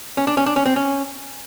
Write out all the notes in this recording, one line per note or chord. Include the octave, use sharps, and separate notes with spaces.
C#4
D4
C#4
D4
C#4
C4
C#4